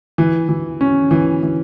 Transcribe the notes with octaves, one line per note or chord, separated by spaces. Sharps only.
E3
E3
C#4
E3
E3